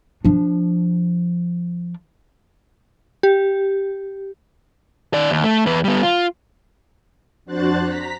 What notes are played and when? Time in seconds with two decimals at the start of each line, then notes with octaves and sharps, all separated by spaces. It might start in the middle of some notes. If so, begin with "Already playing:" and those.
0.25 F3 D4
3.23 G4
5.14 D#3 D5
5.30 D#2
5.44 A3
5.66 E2 B4
5.84 G3 B3
6.03 F4
7.45 F2 D4 F#4 C5 F#6 A6
7.82 A#5 B6